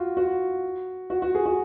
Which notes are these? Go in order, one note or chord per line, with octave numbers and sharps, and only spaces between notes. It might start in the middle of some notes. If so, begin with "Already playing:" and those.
Already playing: F4 F#4
F#4
F#4
F#4
G#4
F#4